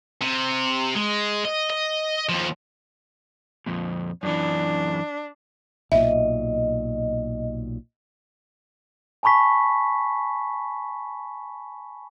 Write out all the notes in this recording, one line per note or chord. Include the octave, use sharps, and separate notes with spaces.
C3
G#3
D#5
D#5
D#2 F3
F2 A#2
F#2 E3 D4
B1 A#2 D#5 E5
G#5 A5 B5 C#6 B6